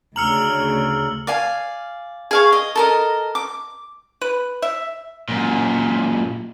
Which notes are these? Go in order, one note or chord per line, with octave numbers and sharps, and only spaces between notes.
D2 C#3 A#5 E6 F6 C#7 F#7
D5 F5 G#5
G#4 F5 C#6
D#5
A4 A#4 D#5
D6
B4
E5
F#2 A#2